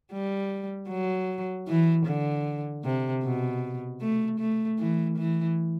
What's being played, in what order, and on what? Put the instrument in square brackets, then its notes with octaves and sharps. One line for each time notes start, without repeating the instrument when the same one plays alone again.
[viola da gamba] G3
F#3
E3
D3
C3
B2
A3
A3
E3
E3